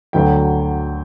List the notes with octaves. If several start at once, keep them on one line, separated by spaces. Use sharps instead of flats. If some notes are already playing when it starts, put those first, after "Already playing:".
D2 D3 F#3 G5